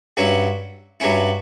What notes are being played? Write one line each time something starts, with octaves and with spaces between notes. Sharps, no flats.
G2 F#3 C#4 E4
G2 F#3 C#4 E4